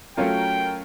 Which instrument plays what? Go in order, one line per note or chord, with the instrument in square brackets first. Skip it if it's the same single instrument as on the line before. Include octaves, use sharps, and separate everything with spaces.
[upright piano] F#3 A3 C#4 F4 A#4 [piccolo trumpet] G5